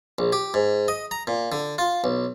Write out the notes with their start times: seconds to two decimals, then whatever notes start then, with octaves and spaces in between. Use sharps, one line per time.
0.19 A#1
0.33 G4
0.54 G#2
0.88 D#5
1.11 A#5
1.27 A#2
1.52 D3
1.78 F4
2.04 B1